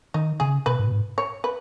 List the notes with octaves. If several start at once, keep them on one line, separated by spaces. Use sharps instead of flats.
D#3 D#4
C#3 G#4
B2 B4
G#2
B2
G#2
C#5
B4